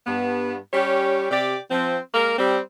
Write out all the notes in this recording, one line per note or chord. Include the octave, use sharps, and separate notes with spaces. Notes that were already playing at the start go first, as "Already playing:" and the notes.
G2 B3
G3 C#4 G4 C#5
C3 G4 D5
F3 C4
G#3 A#3 A#4
G3 C4